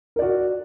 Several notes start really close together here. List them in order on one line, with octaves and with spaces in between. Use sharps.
A#4 D5 F#4